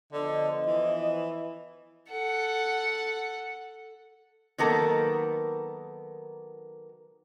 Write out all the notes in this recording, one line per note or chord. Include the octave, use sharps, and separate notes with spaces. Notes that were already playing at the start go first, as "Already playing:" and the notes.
D3 F3 B3 D#5
E3
A4 F#5
D#3 F#3 A#3 B3 A4 A#4